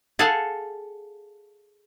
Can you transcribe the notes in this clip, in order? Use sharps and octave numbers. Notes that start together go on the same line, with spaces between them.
G#4 A4 F5 F#5 G#5 A5